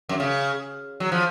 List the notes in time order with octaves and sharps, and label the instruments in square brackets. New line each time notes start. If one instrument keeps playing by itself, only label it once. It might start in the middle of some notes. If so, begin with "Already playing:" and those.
[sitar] F#2
C#3
F#3
F3